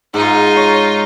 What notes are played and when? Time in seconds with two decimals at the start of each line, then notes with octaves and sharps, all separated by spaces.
0.14 G#2 D#4 F4
0.56 C#5